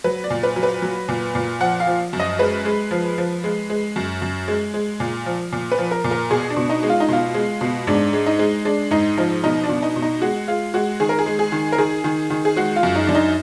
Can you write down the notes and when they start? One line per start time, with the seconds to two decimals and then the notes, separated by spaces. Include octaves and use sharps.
0.04 F#3 B4
0.24 D5
0.30 A#2
0.43 B4
0.56 F#3
0.63 B4
0.82 F#3
1.08 A#2
1.35 A#2
1.60 F3 F#5
1.80 F5
1.87 F3
2.13 F#2
2.20 D#5
2.39 G#3 B4
2.65 G#3
2.91 F3
3.18 F3
3.44 G#3
3.70 G#3
3.96 F#2
4.22 F#2
4.48 G#3
4.74 G#3
5.00 A#2
5.26 F3
5.52 A#2
5.72 B4
5.78 F3
5.91 A#4
6.04 A#2
6.11 A#4
6.30 B2 G#4
6.50 D4
6.56 B2
6.69 D#4
6.83 G#3
6.89 F4
7.00 D#4
7.08 B2 F4
7.34 G#3
7.61 B2
7.87 G#2 D4
8.13 G#3
8.26 D#4
8.39 G#3
8.65 G#3 D4
8.91 G#2 D#4
9.17 F3 D#4
9.44 B2 D#4
9.64 D4
9.69 B2
9.82 D#4
9.96 B2
10.02 D#4
10.21 G#3 F#4
10.48 G#3 F4
10.74 G#3 F#4
11.00 D#3 G#4
11.09 A#4
11.19 G#4
11.26 G#3
11.39 G#4
11.52 D#3
11.72 A#4
11.78 D#3 G#4
12.04 D#3
12.30 D#3
12.45 G#4
12.56 G#3 F#4
12.76 F4
12.83 F#2
12.95 D#4
13.07 F#2 D4
13.15 D#4